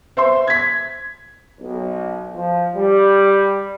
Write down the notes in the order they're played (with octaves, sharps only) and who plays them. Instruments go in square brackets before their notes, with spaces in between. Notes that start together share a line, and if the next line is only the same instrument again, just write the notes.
[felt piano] C5 E5 C6
G#6 B6
[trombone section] B1
F3
G3